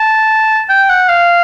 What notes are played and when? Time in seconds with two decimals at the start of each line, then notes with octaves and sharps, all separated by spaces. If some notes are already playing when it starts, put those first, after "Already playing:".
Already playing: A5
0.70 G5
0.90 F#5
1.09 F5